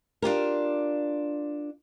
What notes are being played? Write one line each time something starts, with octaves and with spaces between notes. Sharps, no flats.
D4 F4 G4 A#4